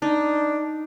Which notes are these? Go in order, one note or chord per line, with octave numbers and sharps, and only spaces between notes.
D4 D#4